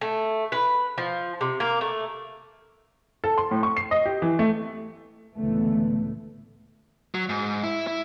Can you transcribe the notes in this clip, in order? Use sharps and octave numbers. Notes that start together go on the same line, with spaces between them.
A3
B4
F3
C3
A#3
A3
A4
C6
A2
C#6
C7
D#5
G4
E3
A3
C#2 A2 D3 E3 A3 B3
F#3
G#2
E4
E4